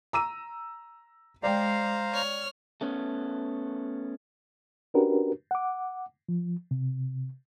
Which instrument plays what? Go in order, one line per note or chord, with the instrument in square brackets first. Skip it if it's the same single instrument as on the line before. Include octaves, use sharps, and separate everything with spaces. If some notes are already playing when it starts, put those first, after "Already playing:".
[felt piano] A#5 E6 D#7
[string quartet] G#3 [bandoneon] C5 F5 A#5 [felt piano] D5 G5
[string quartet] C#5 F6
[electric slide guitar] A3 B3 C#4
[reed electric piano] C#4 D4 F#4 G4 A#4 B4
F#5 D6
F3
C3